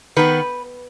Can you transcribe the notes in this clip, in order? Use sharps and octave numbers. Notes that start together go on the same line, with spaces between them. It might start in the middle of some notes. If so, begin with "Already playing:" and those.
D#3 B3 B4